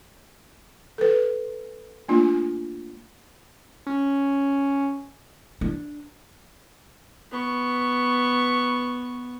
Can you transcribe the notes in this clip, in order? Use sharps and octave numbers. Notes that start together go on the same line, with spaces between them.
A4 B4
A3 A#3 D4 F4
C#4
D4
B3 C#6